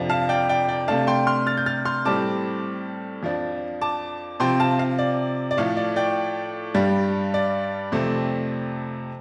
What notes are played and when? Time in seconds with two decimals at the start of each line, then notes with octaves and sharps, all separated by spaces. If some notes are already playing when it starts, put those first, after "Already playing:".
Already playing: F2 C3 F3 D4
0.09 F5 A5
0.29 D5 G5
0.49 D5 G5
0.68 D5 G5
0.88 C3 A3 D4 F5 A5
1.07 G5 C6
1.27 C6 F6
1.47 F6 A6
1.58 G6
1.66 F6 A6
1.85 C6 F6
2.05 A2 G3 C4 A5 D6
3.23 F2 F3 D4
3.81 A5 D6
4.40 C3 F3 C4 G5 C6
4.60 F5 A5
4.79 F5
4.99 D5
5.51 D5
5.57 A2 F3 A3 F5
5.77 D5
5.96 D5 G5
6.74 G2 G3 D4
7.34 D5
7.92 F2 C3 A3 C4